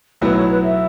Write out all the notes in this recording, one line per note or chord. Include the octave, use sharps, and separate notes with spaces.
B1 A2 F#3 B3 E4 B4
C#5
B4
E5